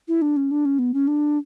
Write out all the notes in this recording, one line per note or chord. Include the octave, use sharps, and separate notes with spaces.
E4
D4
C#4
D4
C#4
B3
C#4
D4